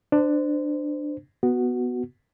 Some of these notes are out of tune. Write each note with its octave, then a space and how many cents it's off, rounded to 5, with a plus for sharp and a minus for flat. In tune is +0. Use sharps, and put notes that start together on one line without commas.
D4 +15 C5 -20
B3 +0 F#4 +0